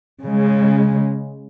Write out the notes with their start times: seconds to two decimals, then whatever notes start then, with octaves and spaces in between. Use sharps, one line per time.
0.24 C#3 G#3